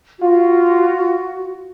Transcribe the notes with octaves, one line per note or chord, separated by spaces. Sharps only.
F4 F#4